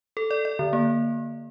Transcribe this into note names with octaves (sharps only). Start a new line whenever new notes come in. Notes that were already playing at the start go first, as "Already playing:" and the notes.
A4
D5
D5
D3
A#3